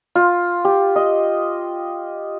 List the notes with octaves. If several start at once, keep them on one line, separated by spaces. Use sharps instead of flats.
F4
G4
D#5